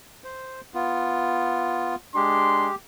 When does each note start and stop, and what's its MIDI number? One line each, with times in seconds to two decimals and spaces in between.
0.24 0.61 72
0.74 1.95 59
0.74 1.95 65
2.16 2.70 56
2.16 2.70 62
2.16 2.75 67
2.16 2.70 84